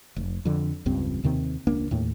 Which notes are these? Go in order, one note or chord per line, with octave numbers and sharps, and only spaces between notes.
F1
F2 D3
E1 C#2 G2 C4
D#2 C3 D#3 C4
E1 C#2 A#3 D4
D#2 A2